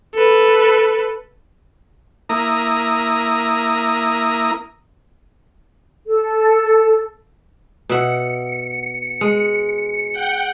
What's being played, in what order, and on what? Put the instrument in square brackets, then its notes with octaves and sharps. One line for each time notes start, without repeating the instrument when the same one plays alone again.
[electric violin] A4 B4
[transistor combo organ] A#3 E4 A#5 D#6
[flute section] A4
[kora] B2 E5 F#5 [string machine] C#7
[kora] G#3
[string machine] F#5 G5